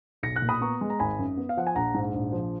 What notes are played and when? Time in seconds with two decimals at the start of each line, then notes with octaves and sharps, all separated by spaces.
0.23 B1 A#6 C#7
0.36 F#6 A#6
0.42 A#2
0.49 B5 D#6
0.61 B3 A#5 C#6
0.81 G#3
0.90 A#5
1.00 G#1 G#5 B5
1.19 F#2
1.37 B3
1.49 F5
1.57 F3 F#5
1.67 G#5
1.75 A#1 F#5 A#5
1.94 G#2
2.14 A#1
2.32 F3